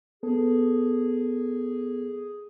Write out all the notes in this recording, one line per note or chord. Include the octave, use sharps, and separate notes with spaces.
B3 G#4 A4